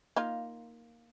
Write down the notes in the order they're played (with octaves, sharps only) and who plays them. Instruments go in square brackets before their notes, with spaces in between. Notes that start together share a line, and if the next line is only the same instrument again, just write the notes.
[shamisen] A#3 D#4 F4